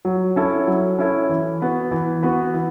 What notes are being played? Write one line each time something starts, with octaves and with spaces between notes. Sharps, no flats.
F#3
C#4 E4 A4
F#3
C#4 E4 A4
E3
B3 F#4 B4
E3
B3 F#4 B4
E3